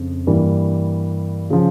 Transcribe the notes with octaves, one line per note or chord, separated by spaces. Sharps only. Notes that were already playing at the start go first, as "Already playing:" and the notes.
Already playing: F2 C#3
G2 E3 G3 A#3
C#3 F3